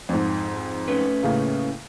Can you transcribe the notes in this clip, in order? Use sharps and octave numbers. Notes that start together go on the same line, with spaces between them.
F2 G#2
A3 C#4 B4
A2 C#3 A#3